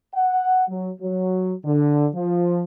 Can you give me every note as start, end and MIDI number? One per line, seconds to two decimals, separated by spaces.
0.14 0.64 78
0.68 0.90 54
1.00 1.53 54
1.64 2.06 50
2.14 2.63 53